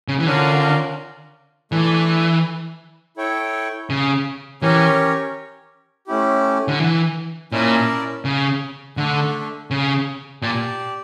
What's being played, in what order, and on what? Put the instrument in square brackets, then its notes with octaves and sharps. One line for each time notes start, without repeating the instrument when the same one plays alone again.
[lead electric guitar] C#3
E3
[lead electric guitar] D3 [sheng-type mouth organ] C#4 F4 A#4 D5 F5
[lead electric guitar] E3 [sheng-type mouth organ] A3 D4 A4 D5 A5
[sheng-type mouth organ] E4 A4 C#5 G5
[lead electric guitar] C#3
[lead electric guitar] E3 [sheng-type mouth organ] C#4 G4 A#4 C#5
[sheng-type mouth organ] A3 C#4 E4 G4
[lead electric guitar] D3
E3
[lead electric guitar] A#2 [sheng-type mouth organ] C#4 E4 A#4 D5 A5
[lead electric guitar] C#3
[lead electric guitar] D3 [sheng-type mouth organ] A3 D4 A4
[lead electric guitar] C#3
[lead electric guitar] A#2 [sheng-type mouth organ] G4 D5 A5